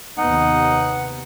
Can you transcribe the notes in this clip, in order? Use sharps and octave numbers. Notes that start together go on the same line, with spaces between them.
D#2 C3 B3 D#4 F#5